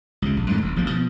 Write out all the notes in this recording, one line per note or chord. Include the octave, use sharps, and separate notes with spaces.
C#2 C3
A#1
F#2 A2 D3 G#3
E1 D2
A1 F3 A#3
B2 F3